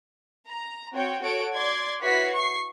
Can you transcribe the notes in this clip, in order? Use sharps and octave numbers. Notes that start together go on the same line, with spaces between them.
A#5
C4 F#4 C#5 G5
F#4 A4 C#5 F#5 D7
D5 C6 G#6
E4 F#4 B4 C#5 B6 C7
C#6 C7